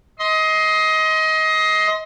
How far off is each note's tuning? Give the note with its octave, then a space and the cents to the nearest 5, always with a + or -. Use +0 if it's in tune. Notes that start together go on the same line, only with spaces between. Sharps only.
D#5 +25 C6 +0